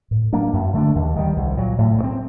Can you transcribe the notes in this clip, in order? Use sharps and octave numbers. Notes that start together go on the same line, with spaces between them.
A2
F#3 A#3 D4
F#2
D3 A3 D4
D#2
D#3 G3
C2
A#2 F#3
A2
A3
C4